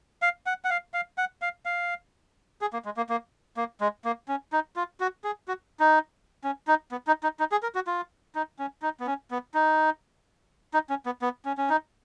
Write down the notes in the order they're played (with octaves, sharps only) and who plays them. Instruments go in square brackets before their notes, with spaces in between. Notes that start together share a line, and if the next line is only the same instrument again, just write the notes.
[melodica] F5
F#5
F#5
F5
F5
F#5
F5
F5
G#4
A#3
G#3
A#3
A#3
A#3
G#3
A#3
C#4
D#4
F4
F#4
G#4
F#4
D#4
C#4
D#4
B3
D#4
D#4
D#4
G#4
A#4
F#4
F4
D#4
C#4
D#4
B3
C#4
B3
D#4
D#4
C#4
B3
B3
C#4
C#4
D#4